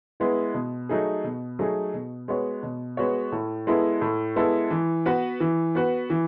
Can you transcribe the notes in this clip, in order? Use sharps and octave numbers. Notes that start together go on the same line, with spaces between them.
G#3 B3 E4
B2
F#3 A3 D#4 G#4
B2
F#3 A3 D#4 G#4
B2
G#3 B3 F#4 C#5
B2
G#3 B3 F#4 C#5
A2
G#3 B3 E4 A4
A2
G#3 B3 E4 A4
E3
B3 F#4 B4
E3
B3 F#4 B4
E3